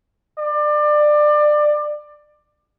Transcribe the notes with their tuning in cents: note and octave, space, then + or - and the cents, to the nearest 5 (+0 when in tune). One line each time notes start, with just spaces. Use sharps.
D5 +25